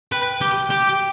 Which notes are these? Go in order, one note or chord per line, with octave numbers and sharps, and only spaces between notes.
B4 G5
G4
G4